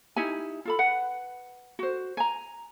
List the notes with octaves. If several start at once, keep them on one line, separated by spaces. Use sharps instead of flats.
D#4 E4 G4 G#5
F4 A4 B5
B4 F#5
F#4 C5
G#5 A#5